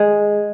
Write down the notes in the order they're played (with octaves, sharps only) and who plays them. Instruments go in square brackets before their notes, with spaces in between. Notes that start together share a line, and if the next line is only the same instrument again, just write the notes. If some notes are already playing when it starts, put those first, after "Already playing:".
Already playing: [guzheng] G#3